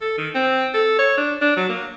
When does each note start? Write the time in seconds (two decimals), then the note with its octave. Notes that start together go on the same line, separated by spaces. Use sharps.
0.01 A4
0.18 D#3
0.35 C4
0.74 A4
0.99 C#5
1.17 D4
1.41 D4
1.57 F#3
1.69 A#3